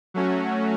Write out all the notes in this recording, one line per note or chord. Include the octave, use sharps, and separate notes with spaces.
F#3 A3 C#4 F#4